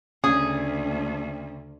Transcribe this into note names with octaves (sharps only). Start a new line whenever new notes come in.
D2 C#3 G#4